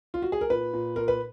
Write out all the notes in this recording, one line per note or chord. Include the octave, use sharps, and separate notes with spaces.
F4
F#4
G#4
A#4
A#2 B4
A#2
A#2 A#4
B4